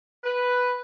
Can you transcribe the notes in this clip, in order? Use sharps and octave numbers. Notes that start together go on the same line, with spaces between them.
B4